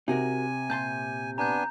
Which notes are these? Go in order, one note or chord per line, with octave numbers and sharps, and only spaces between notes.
C3 D#4 F#4 A#4 G#5
A#2 A5 C6 G6
B3 D4 G#5 A#5 G6